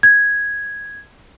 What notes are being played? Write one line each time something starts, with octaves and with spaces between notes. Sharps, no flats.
G#6